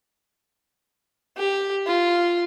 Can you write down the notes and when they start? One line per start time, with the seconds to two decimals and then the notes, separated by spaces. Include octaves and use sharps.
1.37 G4
1.87 F4